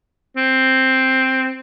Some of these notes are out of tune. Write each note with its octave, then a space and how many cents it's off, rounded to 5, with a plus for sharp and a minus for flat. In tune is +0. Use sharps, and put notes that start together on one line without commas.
C4 +5